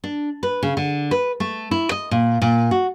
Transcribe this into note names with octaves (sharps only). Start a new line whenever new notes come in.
D4
B4
C#3
D3
B4
A3
E4
D#5
A#2
A#2
F#4